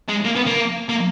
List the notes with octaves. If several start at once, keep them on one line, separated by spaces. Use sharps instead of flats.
G#3
A#3
B3
A#3
A#3